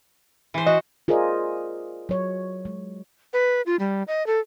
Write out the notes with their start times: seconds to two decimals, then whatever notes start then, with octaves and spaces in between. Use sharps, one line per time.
0.54 E3 C5
0.66 F#4 D#5
1.08 F4 G#4 A#4 C5 D5 D#5
2.09 F#3 C#5
2.65 G#3
3.33 B4
3.66 F4
3.79 G3
4.08 D#5
4.27 A4